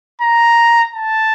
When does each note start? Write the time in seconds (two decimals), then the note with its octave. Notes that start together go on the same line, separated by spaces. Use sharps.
0.22 A#5
0.95 A5